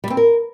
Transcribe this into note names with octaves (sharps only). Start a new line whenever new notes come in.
G3
C4
A#4